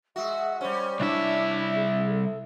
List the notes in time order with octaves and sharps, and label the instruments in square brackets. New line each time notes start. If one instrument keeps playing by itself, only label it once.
[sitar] G#3 F#4 [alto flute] E5
[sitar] G3 C#4 [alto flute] C5
[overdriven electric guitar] C2 E5 [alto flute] D4 [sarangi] E4
[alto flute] G#4
A4